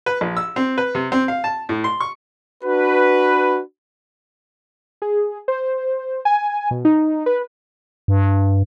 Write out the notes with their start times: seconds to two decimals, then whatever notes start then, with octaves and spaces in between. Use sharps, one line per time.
0.06 B4
0.21 A#1
0.37 E6
0.56 C4
0.78 B4
0.95 C3
1.12 C4
1.28 F5
1.44 A5
1.69 A2
1.84 C6
2.00 C#6
2.64 D4 F#4 B4
5.02 G#4
5.48 C5
6.25 G#5
6.71 B2
6.85 D#4
7.26 B4
8.08 G2